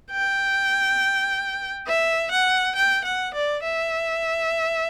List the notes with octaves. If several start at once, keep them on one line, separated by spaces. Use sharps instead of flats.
G5
E5
F#5
G5
F#5
D5
E5